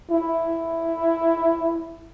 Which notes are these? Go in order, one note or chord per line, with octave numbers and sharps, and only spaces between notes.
E4